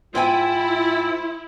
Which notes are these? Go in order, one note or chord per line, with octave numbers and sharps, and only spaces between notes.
G#2 E4 F4 G5 G#5